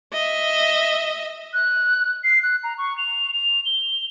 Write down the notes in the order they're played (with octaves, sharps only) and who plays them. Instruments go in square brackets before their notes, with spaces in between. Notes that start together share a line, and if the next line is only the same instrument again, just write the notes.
[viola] D#5 E5
[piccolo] F#6
C7
F#6
A#5
C#6
F7
F7
G7